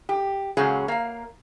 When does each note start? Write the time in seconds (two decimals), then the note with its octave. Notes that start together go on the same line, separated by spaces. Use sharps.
0.09 G4
0.57 A#2 C#3 F#3 G#3 C#4 G#4
0.88 A#3 F5